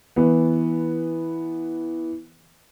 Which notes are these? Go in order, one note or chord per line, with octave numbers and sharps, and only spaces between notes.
E3 B3